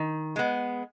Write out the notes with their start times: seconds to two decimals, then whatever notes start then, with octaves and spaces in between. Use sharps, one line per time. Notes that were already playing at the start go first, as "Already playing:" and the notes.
Already playing: D#3
0.36 G#3 B3